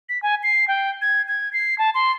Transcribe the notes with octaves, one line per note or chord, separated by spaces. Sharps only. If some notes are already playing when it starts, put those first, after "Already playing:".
B6
G#5
C7
G5
G#6
G#6
C7
A5
C6